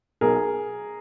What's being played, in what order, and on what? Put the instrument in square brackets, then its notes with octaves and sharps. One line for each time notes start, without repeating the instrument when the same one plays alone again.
[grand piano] B1 G#4 A#4